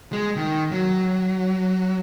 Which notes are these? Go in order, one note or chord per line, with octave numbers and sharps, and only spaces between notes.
G#3
D#3
F#3